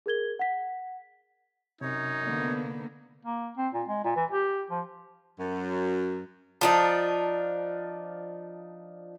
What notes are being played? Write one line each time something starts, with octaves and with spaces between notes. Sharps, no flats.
G#4 A#4 G#6 G7
F#5 B6
F#2 C3 D#4 C#5
D3 A#3 B3
A#3
C4
A#2
G#3
A#2
E3
G4
F3
F#2
F3 D4 D#4